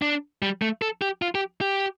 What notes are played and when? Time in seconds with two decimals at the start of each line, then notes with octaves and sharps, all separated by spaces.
0.02 D4
0.42 G3
0.62 A3
0.82 A4
1.02 G4
1.22 F4
1.35 G4
1.61 G4